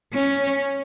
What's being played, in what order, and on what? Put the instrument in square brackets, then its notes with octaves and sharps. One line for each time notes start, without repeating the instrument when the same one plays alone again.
[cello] C#4